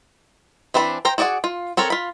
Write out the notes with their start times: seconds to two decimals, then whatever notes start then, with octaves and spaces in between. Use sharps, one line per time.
0.74 E3 C4 D4 B5
1.05 C5 G5 A#5
1.18 F#4 G#4 D5 D#5 F#5
1.44 F4
1.77 C4 A4 A#4 C#5
1.90 F4 B5